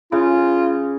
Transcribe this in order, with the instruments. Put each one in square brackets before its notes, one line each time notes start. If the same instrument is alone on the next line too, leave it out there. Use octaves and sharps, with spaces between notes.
[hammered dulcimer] C#3 [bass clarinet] F4